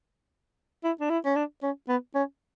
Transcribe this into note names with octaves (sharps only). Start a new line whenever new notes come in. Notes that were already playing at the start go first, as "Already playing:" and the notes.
E4
D4
E4
C#4
D4
C#4
B3
C#4